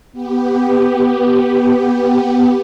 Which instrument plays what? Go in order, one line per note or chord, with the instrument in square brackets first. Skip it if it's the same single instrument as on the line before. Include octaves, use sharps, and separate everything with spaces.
[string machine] B3 G4